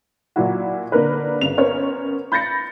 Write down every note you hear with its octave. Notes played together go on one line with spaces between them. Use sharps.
A#2 F#3 E4 F#4
D3 A#3 A#4 B4
G1 C#3 F7
B3 C#4 A#4 C5 C#5
B5 G6 A6 A#6 C#7